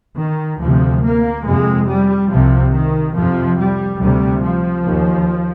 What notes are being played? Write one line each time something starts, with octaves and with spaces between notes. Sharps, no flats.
D#3
D2 C3 F3
A#3
F2 C3 G#3
G3
C2 C3 F3
D#3
F2 C3 F3
G3
D2 C3 G3
F3
D#2